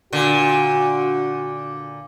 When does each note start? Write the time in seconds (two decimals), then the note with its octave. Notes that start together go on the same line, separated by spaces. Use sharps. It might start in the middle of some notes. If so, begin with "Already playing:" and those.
0.13 A#2 D3 F#4